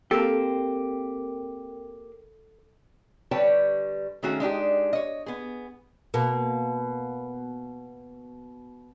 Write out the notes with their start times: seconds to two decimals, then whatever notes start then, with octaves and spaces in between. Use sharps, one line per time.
0.11 A#3 C4 G4 A4
3.31 D3 G3 B4 C#5 G5 A5
4.23 D#3 A3 C#4 F#4 G#4
4.40 G#3 D4 D#4 G4
4.93 C#5 D#5
5.26 B3 G#4
6.14 B2 A#3